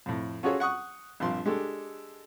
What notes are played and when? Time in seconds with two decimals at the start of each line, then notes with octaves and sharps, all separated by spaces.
0.06 F2 A2
0.43 C#4 F4 F#4 G#4 A4 C#5
0.60 F#5 C#6 D#6 F#6
1.20 A#1 G2 F3 C4 C6
1.46 G#3 D4 G4 A4